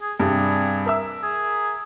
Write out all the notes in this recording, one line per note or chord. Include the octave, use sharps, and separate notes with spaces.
G#4
G2 C3 G3 G#4
A#4 E5 E6
G#4